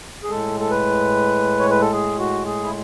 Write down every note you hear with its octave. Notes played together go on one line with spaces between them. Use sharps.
G#4
A2 G#3 A4
A4
B4
C#5
B4
A4
G#4
F#4
G#4
E4